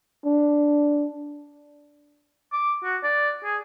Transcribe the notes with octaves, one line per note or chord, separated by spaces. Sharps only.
D4
D6
F#4
D5
G#4